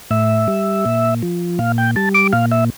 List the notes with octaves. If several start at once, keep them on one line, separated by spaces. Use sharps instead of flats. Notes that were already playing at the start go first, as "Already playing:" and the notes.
A2 E5
G3
A#2
F3
A#2 F5
G5
G3 A5
D6
A#2 F5
E5